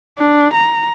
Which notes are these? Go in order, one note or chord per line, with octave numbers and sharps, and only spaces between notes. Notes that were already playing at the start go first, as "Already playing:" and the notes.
D4
A#5